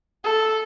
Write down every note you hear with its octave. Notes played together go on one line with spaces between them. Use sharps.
A4